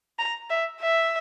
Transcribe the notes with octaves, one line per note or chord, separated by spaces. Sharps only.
A#5
E5
E5